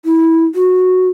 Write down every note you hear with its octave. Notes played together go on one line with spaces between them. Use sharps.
E4
F#4